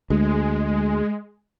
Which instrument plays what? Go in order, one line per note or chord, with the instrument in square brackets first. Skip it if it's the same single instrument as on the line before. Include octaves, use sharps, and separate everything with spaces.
[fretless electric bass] D2 [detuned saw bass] G#3